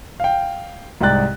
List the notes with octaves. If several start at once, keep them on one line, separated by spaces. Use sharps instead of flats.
F5 G5
C2 G#2 D5 G5 F#6 A6